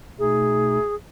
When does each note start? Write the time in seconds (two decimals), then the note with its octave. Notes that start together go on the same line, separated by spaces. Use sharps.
0.19 B2 A3 D#4 G#4